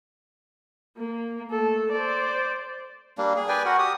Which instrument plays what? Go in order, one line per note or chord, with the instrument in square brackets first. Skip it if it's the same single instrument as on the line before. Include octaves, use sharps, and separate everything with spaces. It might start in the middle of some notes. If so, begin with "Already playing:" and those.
[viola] A#3
A3 A4
C5 D5
[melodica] G3 A#3 D4
G#4
B4 D5 G5 G#5
F#4 A#4 F#5
G4 D#6